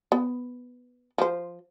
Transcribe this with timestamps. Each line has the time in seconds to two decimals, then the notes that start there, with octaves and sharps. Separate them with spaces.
0.12 B3
1.18 F3 C5